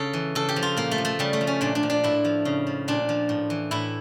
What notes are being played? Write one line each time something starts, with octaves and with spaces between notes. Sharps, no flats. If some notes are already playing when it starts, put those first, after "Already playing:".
Already playing: C#3 A4
E3
C#3 A4
G4
F3
F4
A#2 A#3
A3
F3
A3
C#3 G3
A3
F3
C#4
A#2 D4
D4
F3
D4
A2 E4
F3
C#3
F3
A#2 D4
F3
A2
E3
A2 E4